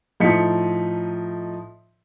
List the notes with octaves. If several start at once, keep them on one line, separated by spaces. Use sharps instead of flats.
A2 F3 D#4 D#5 B6 C#7